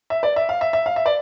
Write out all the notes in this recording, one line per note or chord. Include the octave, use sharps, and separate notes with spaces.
E5
D5
E5
F5
E5
E5
F5
E5
D5